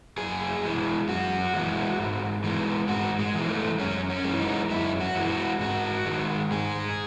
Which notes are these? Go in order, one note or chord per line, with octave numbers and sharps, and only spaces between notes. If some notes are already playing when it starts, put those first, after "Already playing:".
F#2 G#4
E3 G#3
F#2 F#4
E3 G#3
G#2
E3 G#3
G#2 F#4
G#3
E3 G#3
A3
F#2 C#4
C#4
E3 G#3
D#4
F#2 E4
F#4
E3 G#3
F#4
G#2 F#4
D#3 G#3
G#2 G#4